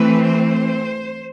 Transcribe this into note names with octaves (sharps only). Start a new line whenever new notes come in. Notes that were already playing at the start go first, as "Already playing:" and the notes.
Already playing: E3 A3 C4 B4
C5